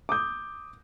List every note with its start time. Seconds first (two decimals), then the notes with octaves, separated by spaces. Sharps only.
0.09 D6 D#6 G6